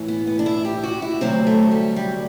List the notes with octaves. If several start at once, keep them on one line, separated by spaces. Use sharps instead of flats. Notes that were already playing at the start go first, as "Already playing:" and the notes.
Already playing: A2 E3
B3
B3
D4
E4
G4
F#4
E4
D2 C3 F#3 C4
A3
G3
G3